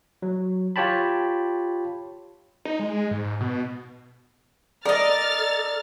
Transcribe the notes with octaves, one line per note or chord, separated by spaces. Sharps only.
F#3
F4 G4 C#5 G5 A5 B5
D#4
G#3
G#2
B2
A4 A#4 D5 D#5 F6 A6